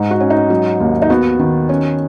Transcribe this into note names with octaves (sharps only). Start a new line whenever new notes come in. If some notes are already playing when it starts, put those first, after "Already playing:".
Already playing: G#2 D#4
F#4
C#4
D#4
F#3
D#2
D#4
B3 F#4
D#3
C#4